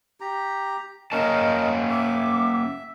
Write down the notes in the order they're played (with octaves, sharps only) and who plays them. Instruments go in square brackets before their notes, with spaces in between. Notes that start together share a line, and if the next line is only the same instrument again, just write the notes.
[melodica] G4 A#5
[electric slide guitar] A#3 C#4 A5 [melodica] A#4 [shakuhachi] D#5
[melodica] E5 [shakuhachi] D6